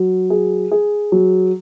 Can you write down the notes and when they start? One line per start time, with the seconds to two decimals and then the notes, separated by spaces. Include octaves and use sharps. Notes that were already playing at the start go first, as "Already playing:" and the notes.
Already playing: F#3
0.30 G#4
0.71 G#4
1.12 F#3